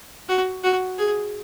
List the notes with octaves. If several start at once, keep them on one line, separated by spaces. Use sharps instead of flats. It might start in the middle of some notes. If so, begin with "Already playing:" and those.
F#4
F#4
G#4